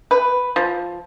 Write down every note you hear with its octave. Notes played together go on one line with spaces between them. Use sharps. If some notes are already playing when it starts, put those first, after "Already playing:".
B4
F3